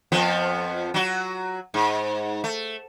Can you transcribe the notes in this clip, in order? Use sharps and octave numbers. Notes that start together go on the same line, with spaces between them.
F2 F3 B3
F#3 F#4
G#2
A3